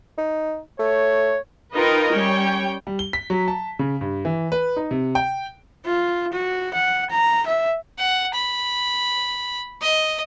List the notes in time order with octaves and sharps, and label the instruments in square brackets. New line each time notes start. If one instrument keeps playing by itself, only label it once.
[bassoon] D#4
[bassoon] A3 [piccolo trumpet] C#5
[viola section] D#4 F4 A#4 B4 D#5 G5
G3 C#4 C#5 G5
[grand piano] G3
G7
B6
F#3
A5
C#3
G2
E3
B4
D#4
C3
G5
[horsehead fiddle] F4
F#4
F#5
A#5
E5
[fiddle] F#5
B5
D#5